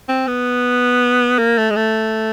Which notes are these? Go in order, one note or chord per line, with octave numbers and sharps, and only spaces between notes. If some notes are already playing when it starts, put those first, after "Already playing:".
C4
B3
A#3
A3
G#3
A3